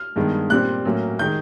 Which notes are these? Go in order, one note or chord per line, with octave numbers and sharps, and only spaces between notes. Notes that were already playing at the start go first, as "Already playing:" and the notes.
Already playing: F6
G2 D#3 G#3 B3
A#2 G3 C4 F#6
A2 F#3 A#3 C#4
D#3 G#3 G6